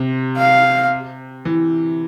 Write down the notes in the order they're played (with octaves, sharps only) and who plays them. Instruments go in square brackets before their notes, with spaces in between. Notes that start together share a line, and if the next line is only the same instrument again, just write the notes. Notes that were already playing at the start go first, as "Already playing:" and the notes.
Already playing: [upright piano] C3
[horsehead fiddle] F5
[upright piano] E3